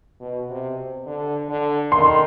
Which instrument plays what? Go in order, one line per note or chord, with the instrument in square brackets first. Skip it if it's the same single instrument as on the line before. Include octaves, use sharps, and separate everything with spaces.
[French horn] B2
C3
D3
D3
[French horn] D#3 [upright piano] C6